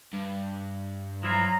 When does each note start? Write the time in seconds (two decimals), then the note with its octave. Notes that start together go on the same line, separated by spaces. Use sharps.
0.13 G2
1.23 F3 F#3 E4 F4 A#5